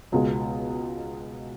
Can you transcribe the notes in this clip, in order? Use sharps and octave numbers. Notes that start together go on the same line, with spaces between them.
C#2 B2 G#3